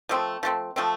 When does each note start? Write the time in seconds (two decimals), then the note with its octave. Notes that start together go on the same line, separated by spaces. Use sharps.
0.09 F3 A3 C4
0.43 F3 A3 C4
0.76 F3 A3 C4